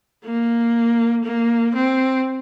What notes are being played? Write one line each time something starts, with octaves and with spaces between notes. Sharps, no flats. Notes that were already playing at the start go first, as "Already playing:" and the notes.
A#3
A#3
C4